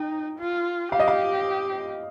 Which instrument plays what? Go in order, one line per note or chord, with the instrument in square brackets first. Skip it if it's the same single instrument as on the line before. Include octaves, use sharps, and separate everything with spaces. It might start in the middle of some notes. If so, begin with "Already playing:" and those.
Already playing: [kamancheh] D#4 [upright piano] G5
[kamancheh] F4
[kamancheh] G4 [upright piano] F5
[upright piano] D#5
F5